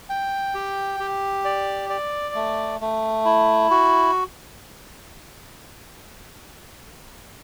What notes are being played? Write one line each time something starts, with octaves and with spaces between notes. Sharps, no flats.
G5
G4
G4
D5
D5
A3
A3
E4
F#4